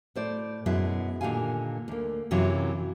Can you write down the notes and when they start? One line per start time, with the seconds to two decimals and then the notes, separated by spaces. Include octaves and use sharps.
0.16 A2 C5 D5
0.66 F#2 B2 G#3 B3 E4
1.21 A#2 D3 D#3 G4 F5 G#5
1.88 D2 A#3
2.31 F#2 C3 E3 F#3 F4